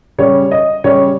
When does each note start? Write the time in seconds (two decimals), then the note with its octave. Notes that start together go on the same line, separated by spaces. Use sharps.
0.18 C#3 G3 C#5
0.51 D#5
0.84 C#3 G3 C#5